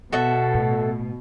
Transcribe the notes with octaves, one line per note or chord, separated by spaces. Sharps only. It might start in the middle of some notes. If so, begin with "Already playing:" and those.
B2 F#4 A4 E5
A2